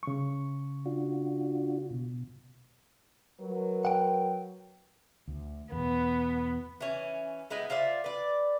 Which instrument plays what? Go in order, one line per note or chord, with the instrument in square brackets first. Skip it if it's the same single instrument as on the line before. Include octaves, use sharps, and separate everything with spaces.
[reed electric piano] C#3 C#6
[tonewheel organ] D4 F4 F#4
B2
[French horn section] F#3 A#4 B4
[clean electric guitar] F#5 G5
[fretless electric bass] D2
[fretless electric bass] E2 B2 [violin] B3
[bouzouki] E3 C#4
G#3 B3 D#4 E4
F4 C5 D5 E5
B4 D5